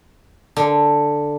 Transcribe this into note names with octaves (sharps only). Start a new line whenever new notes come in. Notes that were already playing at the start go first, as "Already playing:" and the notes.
D3